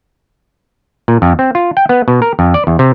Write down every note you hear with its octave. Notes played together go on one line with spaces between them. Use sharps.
A#2
F2
C4
F4
G5
B3
B2
A#4
F2
D5
E2
C3